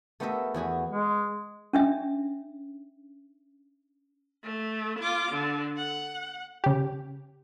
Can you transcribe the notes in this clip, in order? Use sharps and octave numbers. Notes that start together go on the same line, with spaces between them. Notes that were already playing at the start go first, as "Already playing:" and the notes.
A3 B3 G4 A#4 D#5 E5
E2 F#4 G#4 B4
G#3
C#4 D4 E5
A3
F4 D6
D3
F#5
C#3 G4